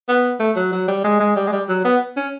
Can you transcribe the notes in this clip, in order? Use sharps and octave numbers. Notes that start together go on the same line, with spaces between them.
B3
A3
F#3
F#3
G3
G#3
G#3
G3
G#3
G3
F#3
B3
C#4